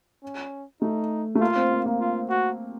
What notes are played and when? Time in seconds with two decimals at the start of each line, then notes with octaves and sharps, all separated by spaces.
0.23 C#4
0.82 A3 D#4
1.35 A3
1.41 A#3 F4
1.56 C4
1.71 A#3
1.86 A#3
2.00 F4
2.30 F#4